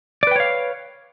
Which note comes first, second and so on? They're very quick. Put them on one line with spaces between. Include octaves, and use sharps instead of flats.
D5 B4 G5 C#5 F5